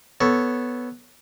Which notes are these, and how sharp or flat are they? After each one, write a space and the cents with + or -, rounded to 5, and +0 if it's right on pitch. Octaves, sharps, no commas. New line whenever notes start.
B3 +0 A4 +0 C#5 +0